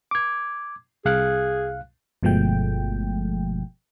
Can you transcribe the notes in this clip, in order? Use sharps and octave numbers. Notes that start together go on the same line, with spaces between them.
D6 G#6
C2 G#4 F5 F#6
G1 B2 F3 G#3 A3 G5